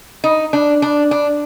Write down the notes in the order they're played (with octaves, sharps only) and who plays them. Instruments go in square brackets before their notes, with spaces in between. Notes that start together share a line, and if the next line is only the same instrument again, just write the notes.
[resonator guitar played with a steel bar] D#4
D4
D4
D4